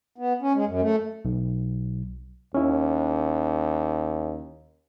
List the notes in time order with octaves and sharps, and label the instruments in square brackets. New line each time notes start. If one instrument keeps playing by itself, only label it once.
[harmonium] B3
C#4
G#3
F#2
A3
[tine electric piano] B1
[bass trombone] D#2 [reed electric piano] C#4 E4